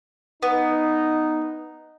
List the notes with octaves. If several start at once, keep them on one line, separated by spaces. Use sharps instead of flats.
B3 D#4